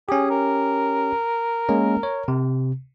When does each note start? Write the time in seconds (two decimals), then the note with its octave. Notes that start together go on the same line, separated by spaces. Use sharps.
0.09 C#4 G4 G#4
0.30 A#4
1.69 G#3 A#3 C#4
2.03 C#5
2.28 C3